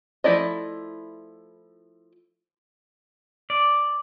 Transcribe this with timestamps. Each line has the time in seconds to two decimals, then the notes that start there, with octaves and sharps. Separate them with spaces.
0.24 F3 A3 E4 D5 D#5
3.50 D5